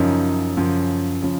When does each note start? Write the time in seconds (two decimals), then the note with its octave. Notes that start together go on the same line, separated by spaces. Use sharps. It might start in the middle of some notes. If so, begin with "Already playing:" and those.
Already playing: F#2 C#3 F3 D#4
0.57 F#2 C#3 F3
1.22 C#3 F3